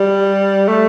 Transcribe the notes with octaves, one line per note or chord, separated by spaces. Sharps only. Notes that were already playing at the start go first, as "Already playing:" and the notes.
Already playing: G3
A3